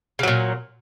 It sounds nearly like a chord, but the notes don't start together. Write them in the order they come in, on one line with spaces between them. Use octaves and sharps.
C#3 F#3 A#2